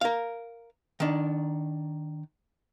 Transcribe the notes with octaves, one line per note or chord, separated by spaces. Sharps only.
A#4 F5
D#3 D4